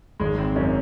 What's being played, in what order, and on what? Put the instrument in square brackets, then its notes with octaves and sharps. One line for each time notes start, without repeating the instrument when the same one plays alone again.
[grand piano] G#1 [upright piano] G#3
[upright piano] C4
[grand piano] F#2 [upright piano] C#4